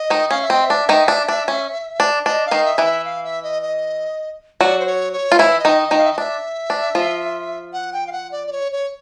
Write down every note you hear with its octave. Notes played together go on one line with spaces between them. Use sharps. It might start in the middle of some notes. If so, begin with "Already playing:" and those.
Already playing: D#5
D#3 D#4
C#4 F5
E5
C4 D#5
E5
D4
D#3 D#4
D4
D4
C#4
D4
D4 D#5
F5
D#3 D#4
E5
E3 E4 D#5
E5
F5
E5
D#5
D#5
F#3 F#4 D5
C5
C#5
C#5
F4
E3 E4 C#5
E5
D#5
D#3 D#4
D#5
D#3 D#4
F5
E5
D#5
D4 E5
D4
F3 F4
F#5
G5
F5
F#5
D5
D5
C#5
C#5